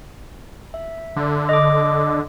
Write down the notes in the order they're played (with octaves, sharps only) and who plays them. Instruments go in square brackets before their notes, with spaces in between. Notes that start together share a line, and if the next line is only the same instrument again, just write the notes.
[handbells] E5
[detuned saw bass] D3
[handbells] D#5 D6